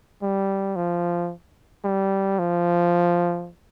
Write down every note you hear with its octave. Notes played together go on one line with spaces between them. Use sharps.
G3
F3
G3
F3